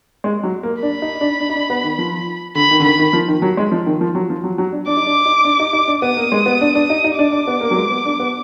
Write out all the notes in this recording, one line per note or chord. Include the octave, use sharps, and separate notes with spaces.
G#3
F#3
A#3
D4 B5
D#4
D4
D4
D#4
D4
B3
D#3
F3
D3 B5
D#3
D3
D#3 B5
D#3
F3
D#3
F#3
G#3
F3
D#3
F3
F#3
F3
F#3
F#3
D4
D4 D6
D#4
D4
D#4
D4
D#4
D#4
D4
B3 D#6
A#3
G#3
B3
D4
D4
D#4
D#4
D4 D6
D4
B3
A#3
F#3
G#3
B3
D4
B3